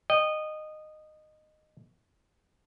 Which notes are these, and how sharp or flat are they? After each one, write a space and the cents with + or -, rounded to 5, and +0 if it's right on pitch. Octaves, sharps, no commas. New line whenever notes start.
D#5 -15 G5 +0